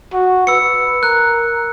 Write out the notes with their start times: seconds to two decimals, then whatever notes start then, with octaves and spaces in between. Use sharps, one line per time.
0.13 F#4
0.47 B4 E6 C#7
1.03 A#4 F#6